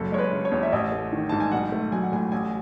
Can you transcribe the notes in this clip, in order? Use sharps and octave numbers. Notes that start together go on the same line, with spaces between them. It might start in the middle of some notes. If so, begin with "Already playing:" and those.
Already playing: F#1 F#2 A4
G#3 C#5
B4
C#3
C#5
E2
E5
A1 D#5
A3
D#3
G#2 A5
G#5
B1 F#5
A3
F#3 G#5
F#5
A2 G#5
A1 G#5